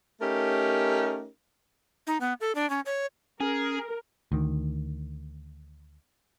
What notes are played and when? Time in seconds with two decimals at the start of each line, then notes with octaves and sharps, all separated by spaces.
0.21 A3 C#4 D#4 G4 A#4
2.07 D#4
2.20 B3
2.40 A4
2.55 D4
2.70 C#4
2.86 C#5
3.40 C#4 G#4 A#4
4.32 D2 D#3